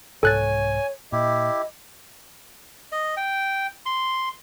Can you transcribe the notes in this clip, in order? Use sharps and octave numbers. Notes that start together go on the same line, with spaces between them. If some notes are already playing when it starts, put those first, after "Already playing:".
C2 G#2 A4 C#5 G#5 F#6 A6
A#2 E4 G4 D#5
D#5
G5
C6